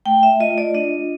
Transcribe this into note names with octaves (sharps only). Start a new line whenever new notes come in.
A3 G5
E5
F4 D#5
D5
D4 D#5